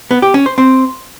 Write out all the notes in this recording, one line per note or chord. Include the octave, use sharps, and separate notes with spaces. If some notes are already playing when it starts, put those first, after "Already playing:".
B3
G4
C#4
C5
C4